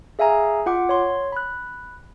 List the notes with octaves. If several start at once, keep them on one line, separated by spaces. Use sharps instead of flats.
G#4 E5 F5 G#5 A#5
F4 F#5 D6
C#5 C6
B5 F#6